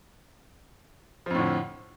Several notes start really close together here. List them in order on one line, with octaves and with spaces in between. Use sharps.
F3 F2 A2 D3